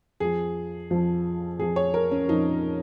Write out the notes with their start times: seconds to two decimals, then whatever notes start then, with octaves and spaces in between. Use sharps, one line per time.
0.20 F2 F3 G#4
0.90 F2 F3
1.59 F2 F3 G#4
1.76 C#5
1.94 A#4
2.11 C#4
2.28 F2 F3 D#4